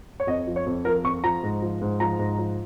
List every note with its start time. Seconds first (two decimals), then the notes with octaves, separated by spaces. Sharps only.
0.20 C#5
0.27 F2 D#5
0.47 F3
0.56 C#5
0.66 F2
0.85 F3 A#4
1.04 F2 C#6
1.24 F3 A#5
1.43 G#2
1.62 F3
1.81 G#2
2.00 F3 A#5
2.19 G#2
2.39 F3